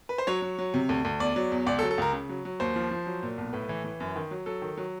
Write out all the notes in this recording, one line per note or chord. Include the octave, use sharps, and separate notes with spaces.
B4
C5
F#3 C#5
F#3
F#3
C3
D2
D2
E2 D5
F#3
E2
C#2 D5
A4
F#3
A4
C#2 A#4
C#3
F#3
F#3
D#2 C5
F3
F3
F#3
A#2
B1
A2 B4
E3
E3
F#2
D#3
F#3
F#3 A4
D#3
F#3